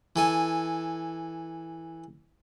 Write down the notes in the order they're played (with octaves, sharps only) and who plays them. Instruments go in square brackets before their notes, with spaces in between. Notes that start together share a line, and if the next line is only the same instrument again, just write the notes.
[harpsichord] E3 A4 G#5